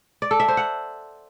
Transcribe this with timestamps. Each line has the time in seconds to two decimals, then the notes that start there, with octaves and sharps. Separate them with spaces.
0.22 D5
0.31 A4
0.40 E5
0.48 C5
0.57 F#5